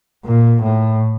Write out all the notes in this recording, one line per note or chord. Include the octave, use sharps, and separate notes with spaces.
A#2
A2